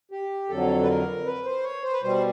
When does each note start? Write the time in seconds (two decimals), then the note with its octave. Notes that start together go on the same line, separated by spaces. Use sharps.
0.11 G4
0.49 F2 D3 F#3 A4
0.83 B4
0.88 A#4
1.26 B4
1.45 C5
1.63 C#5
1.83 C5
1.93 B4
2.02 B2 G3 C5